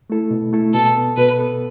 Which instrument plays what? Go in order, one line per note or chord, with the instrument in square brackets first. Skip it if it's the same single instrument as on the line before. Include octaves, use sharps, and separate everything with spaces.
[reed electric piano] A3 E4 A4
B2
A3 E4 A4
[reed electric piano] B2 [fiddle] A4
[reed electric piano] B3 A4
[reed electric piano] B2 [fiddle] B4
[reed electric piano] B3 A4